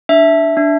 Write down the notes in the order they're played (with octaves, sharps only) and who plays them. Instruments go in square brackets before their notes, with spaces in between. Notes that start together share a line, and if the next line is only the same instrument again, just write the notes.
[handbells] D4 E5
D4